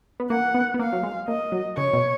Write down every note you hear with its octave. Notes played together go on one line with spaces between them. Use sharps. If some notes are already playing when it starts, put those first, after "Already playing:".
B3
A#3 F#5
B3
B3
A#3 F5
F#3
G#3
A#3 D#5
F#3
C#3 C#5
B2